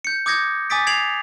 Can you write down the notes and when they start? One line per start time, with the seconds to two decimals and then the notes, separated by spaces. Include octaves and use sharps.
0.05 G6 C#7
0.26 D6 D#6 G6 G#6 A#6 C#7
0.70 G#5 D6 D#6 A6 B6 D7
0.87 G#6 C7 D7 F7 F#7